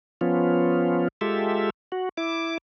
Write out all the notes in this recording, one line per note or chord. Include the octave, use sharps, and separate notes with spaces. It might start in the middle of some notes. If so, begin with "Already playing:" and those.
F3 B3 C#4 F4
G#3 F4 G4 A4 E5
F#4
E4 D6